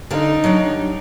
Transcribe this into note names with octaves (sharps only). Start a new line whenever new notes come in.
D3 D#4 D5 F5
F#3 G3 D4